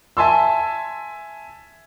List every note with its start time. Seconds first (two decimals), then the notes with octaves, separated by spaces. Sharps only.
0.17 E5 G#5 A5 C6 E6